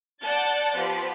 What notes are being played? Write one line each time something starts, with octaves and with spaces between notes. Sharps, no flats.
D5 F#5 A5 G6 A6
F3 B3 G4 B5